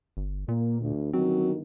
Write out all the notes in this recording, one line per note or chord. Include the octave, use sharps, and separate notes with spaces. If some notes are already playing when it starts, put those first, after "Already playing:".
G1
A#2 A#3
D2
G1 D#3 F#3 C4